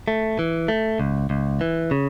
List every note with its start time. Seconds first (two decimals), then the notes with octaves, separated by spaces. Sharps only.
0.08 A3
0.39 E3
0.68 A3
1.00 C#2
1.30 C#2
1.61 E3
1.91 C#3